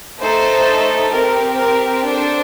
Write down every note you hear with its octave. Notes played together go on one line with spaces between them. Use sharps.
A3 D#4 A4 C5
C4 G4 A#4
A#4
D4 A4 C5